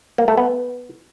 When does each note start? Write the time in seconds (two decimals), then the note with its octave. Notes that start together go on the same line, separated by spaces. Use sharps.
0.18 A#3
0.28 A3
0.37 B3